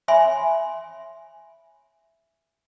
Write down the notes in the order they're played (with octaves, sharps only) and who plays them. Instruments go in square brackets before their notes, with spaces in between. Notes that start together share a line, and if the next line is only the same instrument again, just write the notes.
[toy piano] C#5 E5 G#5 B5 C6